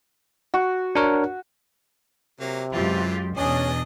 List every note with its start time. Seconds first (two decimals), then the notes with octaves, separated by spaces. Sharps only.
0.54 F#4
0.95 D4 A#4 C#5
2.40 C3 F#3 A#3
2.73 F#2 E3 G#3 F4 G4
3.37 E2 B2 C#4 D4 G#4 D#5 D#6